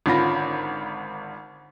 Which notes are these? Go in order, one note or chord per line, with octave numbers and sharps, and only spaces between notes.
G#1 D3 C#4 F4 B5 A#6